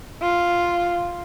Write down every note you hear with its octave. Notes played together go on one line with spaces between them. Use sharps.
F4